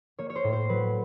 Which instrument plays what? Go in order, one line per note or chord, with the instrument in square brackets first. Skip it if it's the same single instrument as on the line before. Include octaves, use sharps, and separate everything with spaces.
[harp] A#3 C#5
C#5
C5
A2
C5
F#3 B4